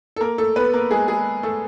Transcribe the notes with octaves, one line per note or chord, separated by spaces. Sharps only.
A4
A#3 A#4
A3 A4
B3 B4
A#3 A#4
G#3 G#4
G#3 G#4
A3 A4